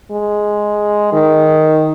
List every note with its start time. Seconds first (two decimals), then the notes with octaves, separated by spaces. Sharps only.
0.11 G#3
1.13 D#3